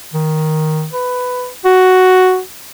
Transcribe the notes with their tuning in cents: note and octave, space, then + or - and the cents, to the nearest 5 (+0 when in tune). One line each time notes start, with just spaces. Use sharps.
D#3 +5
B4 +10
F#4 +5